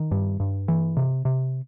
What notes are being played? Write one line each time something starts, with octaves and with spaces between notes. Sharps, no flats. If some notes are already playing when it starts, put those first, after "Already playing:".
Already playing: D#3
G2
G2
E3
C3
C3